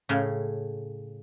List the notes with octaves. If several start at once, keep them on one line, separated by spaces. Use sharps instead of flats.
A2 C#3